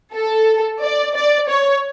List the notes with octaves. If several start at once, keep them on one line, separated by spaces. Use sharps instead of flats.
A4
D5
D5
C#5